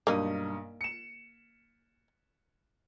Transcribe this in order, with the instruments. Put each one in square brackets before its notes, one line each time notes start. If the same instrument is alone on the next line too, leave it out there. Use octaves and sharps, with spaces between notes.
[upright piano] B1 G2 D#6 [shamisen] A#3 D#4
[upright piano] C#7 E7